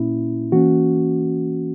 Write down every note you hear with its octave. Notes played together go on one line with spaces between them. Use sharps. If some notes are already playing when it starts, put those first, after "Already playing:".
Already playing: A#2 A#3 C#4 E4
E3 A#3 C#4 F#4